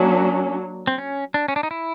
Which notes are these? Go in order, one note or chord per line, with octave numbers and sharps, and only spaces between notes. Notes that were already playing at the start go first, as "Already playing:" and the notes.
Already playing: F#3 A#3 C#4 D4
C4
C#4
D4
C#4
D4
D#4
E4